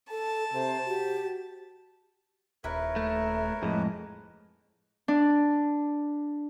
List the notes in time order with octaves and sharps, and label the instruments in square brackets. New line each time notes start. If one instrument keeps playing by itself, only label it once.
[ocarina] A4 [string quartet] A5
[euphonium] C3 [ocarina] C5
[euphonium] F#4 [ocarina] G4
[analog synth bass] D#1 [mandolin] E4 [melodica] A#4 B4 C#5
[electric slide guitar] A3
[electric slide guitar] F2 A2 [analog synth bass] G#3
[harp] D4